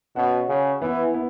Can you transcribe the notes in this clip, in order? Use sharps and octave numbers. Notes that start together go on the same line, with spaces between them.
B2 C#4 F#4
C#3
E3 B3 E4
B3 E4